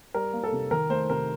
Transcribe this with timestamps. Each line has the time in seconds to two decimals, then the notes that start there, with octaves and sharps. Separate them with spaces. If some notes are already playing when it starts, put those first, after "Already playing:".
0.14 G3 A#4
0.33 A#3
0.44 A4
0.52 C3
0.71 D#3 A#4
0.90 A3 C5
1.10 C3 A#4